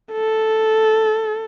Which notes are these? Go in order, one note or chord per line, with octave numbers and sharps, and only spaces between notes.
A4